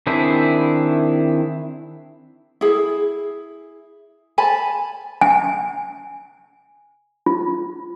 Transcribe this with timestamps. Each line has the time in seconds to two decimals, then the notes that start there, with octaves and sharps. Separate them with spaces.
0.07 D#3 C4 D4 E4 G#4
2.61 E4 G#4
4.38 G#5 A5 B5
5.21 G#5
7.26 F4